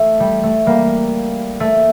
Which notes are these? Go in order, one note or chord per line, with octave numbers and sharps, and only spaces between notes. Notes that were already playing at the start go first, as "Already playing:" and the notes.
Already playing: A3
G3
A3
G3 A#3
A3